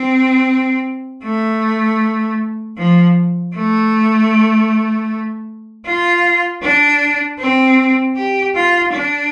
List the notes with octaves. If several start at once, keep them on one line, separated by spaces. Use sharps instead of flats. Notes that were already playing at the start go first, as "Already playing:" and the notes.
Already playing: C4
A3
F3
A3
F4
D4
C4
G4
F4
D4